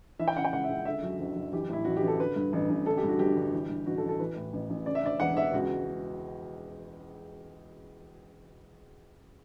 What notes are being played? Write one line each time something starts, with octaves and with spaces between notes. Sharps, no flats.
E3 E5
G5
C#3 F#5
G5
C#2 F#5
E5
C#2
D3 E5
F#2 F#4
F#1
F#1
E3 G4
A2 E4
A1 F#4
G4
A1
A4
D3 B4
G2
A1
A1
D3 A4
G4
G2
F#4
G1 G4
G1
E3
G2
A1 F#4
A4
A1
A4
E3 B4
A2
A1
A1
C#3 D5
E5
D2 D5
E1 F#5
E1 E5
C#2 F#4